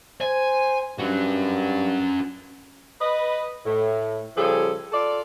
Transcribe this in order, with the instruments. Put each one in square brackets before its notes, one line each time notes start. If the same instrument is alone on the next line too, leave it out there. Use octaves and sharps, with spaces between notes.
[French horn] C5 [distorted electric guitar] G#5
[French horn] G2 [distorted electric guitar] C#4 F#4
[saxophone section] B4 D#5
A2
C#3 F3 G3 G#4 A4
F4 A4 D5